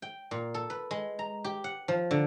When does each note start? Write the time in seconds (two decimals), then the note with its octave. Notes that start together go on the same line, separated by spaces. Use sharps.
0.02 G5
0.31 A#2
0.54 A4
0.70 B4
0.91 G#3
1.19 A#5
1.44 G4
1.64 F#5
1.88 F3
2.11 D3